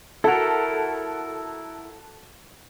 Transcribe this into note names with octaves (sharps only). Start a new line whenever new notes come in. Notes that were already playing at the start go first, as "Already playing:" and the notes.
E4 F#4 A4 A#4